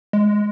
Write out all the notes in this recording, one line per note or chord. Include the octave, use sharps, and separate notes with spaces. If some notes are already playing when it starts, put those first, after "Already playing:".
G#3